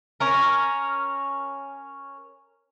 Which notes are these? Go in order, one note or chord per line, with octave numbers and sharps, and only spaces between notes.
C#4 A#4